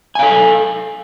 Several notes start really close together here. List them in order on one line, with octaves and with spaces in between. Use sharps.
G#5 F5 A4